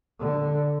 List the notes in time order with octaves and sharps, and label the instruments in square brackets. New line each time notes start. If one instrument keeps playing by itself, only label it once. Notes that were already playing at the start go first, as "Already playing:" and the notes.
[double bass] D3